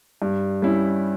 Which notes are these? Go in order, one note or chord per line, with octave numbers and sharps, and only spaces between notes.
G2
G3 C#4 E4